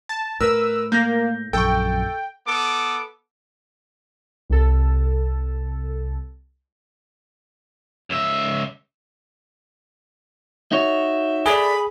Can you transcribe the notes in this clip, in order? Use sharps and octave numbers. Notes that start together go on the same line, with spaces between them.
A5
A2 A#4 B4 E6
A#3 G6 A#6
A#1 F#2 A4 G5 C#6
B3 A4 D6
C2 A4
C#2 E5
D#4 F#4 C#5 E5
G#4 A4 D5 B5